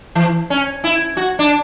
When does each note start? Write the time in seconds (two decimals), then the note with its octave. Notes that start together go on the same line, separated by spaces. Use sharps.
0.15 E3
0.50 C#4
0.84 E4
1.17 F#4
1.39 D4